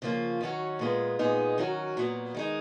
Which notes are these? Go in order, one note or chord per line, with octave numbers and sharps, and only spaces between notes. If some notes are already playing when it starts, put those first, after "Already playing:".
C#3 F3 A#3 F4
D#3 F#3 C#4 F#4
A#2 G#3 B3 F4 G#4
A#2 G#3 B3 D#4 G#4
D#3 F#3 C#4 F#4
A#2 F#3 B3
D#3 G#3 D#4